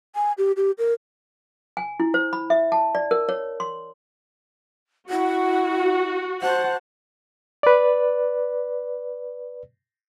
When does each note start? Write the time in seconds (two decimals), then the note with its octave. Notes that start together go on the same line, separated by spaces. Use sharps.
0.15 G#5
0.38 G4
0.57 G4
0.78 A#4
1.77 G#5
2.00 E4
2.14 C5
2.33 B5
2.50 E5
2.72 A5
2.95 D5
3.11 A#4
3.29 C#5
3.60 C6
5.10 E4 F#4 F#5
6.42 C5 F#5 A5
7.63 B4 D5